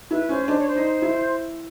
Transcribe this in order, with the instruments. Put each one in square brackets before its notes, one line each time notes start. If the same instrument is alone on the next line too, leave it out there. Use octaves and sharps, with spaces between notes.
[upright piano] E4 [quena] B4
[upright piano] C#4 [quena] C5
[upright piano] D4 [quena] C5
[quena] C#5
C5
[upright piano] D#4
E4